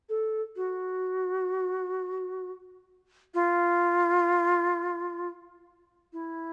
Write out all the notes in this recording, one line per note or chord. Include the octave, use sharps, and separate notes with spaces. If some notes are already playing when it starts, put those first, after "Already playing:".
A4
F#4
F4
E4